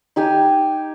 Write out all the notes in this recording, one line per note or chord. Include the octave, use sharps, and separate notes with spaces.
D#4 G4 G#5 A#5